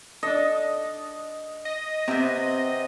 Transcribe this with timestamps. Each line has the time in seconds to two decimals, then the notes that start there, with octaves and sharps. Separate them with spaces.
0.23 D4 A4 D#5
1.65 D#5
2.08 C3 B3 C4